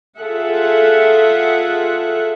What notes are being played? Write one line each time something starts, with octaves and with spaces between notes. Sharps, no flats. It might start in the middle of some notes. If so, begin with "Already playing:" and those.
F4 G#4 A4 E5 F#5